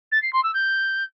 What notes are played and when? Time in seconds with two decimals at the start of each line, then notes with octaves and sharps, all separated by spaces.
0.12 A6
0.22 C7
0.33 C6
0.43 E6
0.54 G6